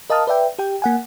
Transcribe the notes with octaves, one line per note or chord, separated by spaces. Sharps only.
A#4 D#5 F5 A5 D#6 F6
B4 D5 E5 G5
G4 G5
A#3 F#5 G#5